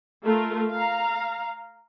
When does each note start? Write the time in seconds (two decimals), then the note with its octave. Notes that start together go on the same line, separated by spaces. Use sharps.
0.23 A3 F4 A#4
0.72 F5 A#5